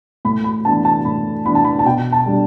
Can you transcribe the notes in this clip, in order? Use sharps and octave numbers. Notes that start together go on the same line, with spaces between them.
A2 B5
B5
E3 B3 D4 A5
A5
A2 B5
E3 B3 D4 B5
A5
B5
A5
B2 G5
A5
G3 D4